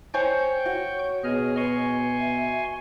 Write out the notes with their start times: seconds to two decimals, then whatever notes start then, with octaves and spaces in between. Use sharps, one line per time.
0.14 C5 C#5 G5 G#5 C#6 G6
0.66 F#4 C#5
1.24 B2 G#4 D#5 F6
1.57 B4 G#5 C6 C#6
2.19 E5